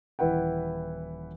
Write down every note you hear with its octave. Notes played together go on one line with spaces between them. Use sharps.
D#1 E3 E4 B4 F#5 G5